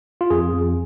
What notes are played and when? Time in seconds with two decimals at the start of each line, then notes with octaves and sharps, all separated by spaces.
0.21 F4
0.30 F2 G#4
0.53 F2